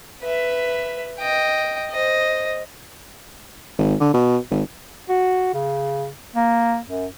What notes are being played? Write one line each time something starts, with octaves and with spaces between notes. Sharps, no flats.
B4 E5
D#5 G5
C5 D#5
G#1
D3
B2
G#1
F#4
C#3
A#3
F#2